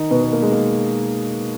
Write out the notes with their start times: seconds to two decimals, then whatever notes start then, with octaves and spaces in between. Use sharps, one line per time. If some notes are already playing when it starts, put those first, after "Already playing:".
Already playing: D#3 D#4
0.11 B2 B3
0.22 B3
0.33 A#3
0.42 G#3
0.52 A#3